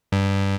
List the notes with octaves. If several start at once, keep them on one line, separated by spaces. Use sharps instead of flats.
G2